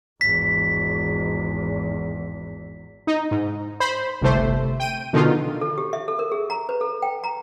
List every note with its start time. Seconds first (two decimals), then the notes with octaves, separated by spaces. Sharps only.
0.21 G#1 E2 B6
3.07 D#4
3.31 G#2
3.80 C5 B5
4.21 G1 C2 C3 A3 C5
4.80 G5 D#7
5.13 B2 D3 D#3 D#4 F4
5.61 A4
5.78 G4
5.93 E5
6.08 A4
6.19 A#4
6.32 G#4
6.50 A#5
6.69 B4
6.81 A4
7.02 G5
7.24 A#5